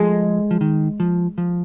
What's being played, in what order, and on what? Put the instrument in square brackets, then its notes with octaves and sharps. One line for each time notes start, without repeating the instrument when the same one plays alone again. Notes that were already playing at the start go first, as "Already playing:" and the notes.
Already playing: [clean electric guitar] F3 [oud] G#3
[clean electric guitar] F3
D#3
F3
F3